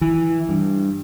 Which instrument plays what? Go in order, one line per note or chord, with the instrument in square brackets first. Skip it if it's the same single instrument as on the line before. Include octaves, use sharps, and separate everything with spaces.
[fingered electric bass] E3
G2